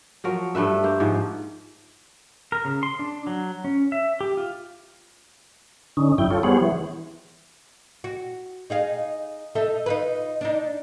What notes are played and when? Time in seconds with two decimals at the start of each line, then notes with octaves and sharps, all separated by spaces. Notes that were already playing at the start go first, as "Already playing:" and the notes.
0.24 F3 F#3 A#4
0.55 G2 A3 B4 E5
0.84 A#3 C5
1.00 G#2 F3
2.52 A#4
2.65 C#3
2.83 C6
2.99 D4
3.27 F#3
3.65 C#4
3.92 E5
4.21 G4
4.37 F4
5.97 D3 C#4 D#4
6.18 F#2 E4 G5
6.31 F4 A4 C#5
6.43 G3 B3 G#4 C5 C#5 F#5
6.61 E3
8.04 F#4
8.70 D#4 G#4 F5
9.55 D#4 A4 E5
9.86 D#4 F4 B4
10.41 D4 D#4